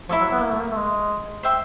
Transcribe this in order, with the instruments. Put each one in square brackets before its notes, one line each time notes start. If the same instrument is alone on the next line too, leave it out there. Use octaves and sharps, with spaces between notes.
[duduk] F3 [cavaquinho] E4 A4 C#5
[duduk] F#3
B3
A#3
A3
A#3
A3
G#3
[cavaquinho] C5 E5 G5 C6